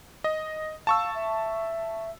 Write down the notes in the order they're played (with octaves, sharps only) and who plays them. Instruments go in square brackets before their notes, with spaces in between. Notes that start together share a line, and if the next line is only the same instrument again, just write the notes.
[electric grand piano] D#5
[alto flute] F5 [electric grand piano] A5 C#6 E6
[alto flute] E5